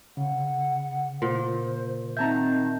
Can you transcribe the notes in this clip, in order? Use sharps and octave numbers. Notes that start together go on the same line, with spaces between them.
C#3 F#5
A#2 C5
D#3 C4 E5 A5 A#5 G6